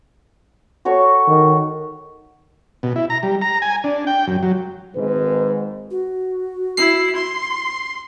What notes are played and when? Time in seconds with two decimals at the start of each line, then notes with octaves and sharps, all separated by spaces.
0.85 F#4 A4 C#5
1.28 D#3
2.83 B2
2.96 E4
3.10 A#5
3.23 G3
3.42 A#5
3.62 G#5
3.84 D4
4.07 G5
4.27 F#2
4.43 F#3
4.96 G#1 G#2 B4
5.91 F#4
6.77 E4 C7
7.16 C6